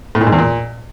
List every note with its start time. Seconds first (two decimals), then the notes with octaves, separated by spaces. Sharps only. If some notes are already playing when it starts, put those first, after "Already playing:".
0.15 A2
0.21 A#2
0.27 G#2
0.33 E2
0.38 A#2